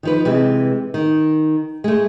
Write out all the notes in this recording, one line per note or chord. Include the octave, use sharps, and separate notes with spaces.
D#3 F3 B4
C3 E3 G#3
D#3
G#3 A3